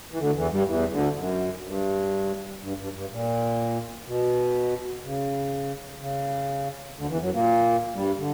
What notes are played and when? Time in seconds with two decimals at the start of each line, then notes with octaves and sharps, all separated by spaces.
0.12 E3
0.19 D2 D3
0.36 E2 E3
0.51 G2 G3
0.67 E2 E3
0.92 D2 D3
1.16 F#2
1.64 G2
2.62 G2
2.78 G2
2.94 G2
3.10 A#2
4.06 B2
5.04 C#3
6.01 C#3
6.98 D2 D3
7.09 E2 E3
7.21 F#2 F#3
7.34 A#2 A#3
7.95 G2 G3
8.18 D3